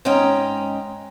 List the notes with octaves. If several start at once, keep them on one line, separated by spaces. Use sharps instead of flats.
G#2 C#4 D#5 G5 A#5